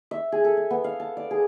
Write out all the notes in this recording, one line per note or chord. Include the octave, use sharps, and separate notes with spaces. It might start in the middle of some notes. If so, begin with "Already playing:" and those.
E5
G#4
A4
E5
B3
F5
A5
D5
G#4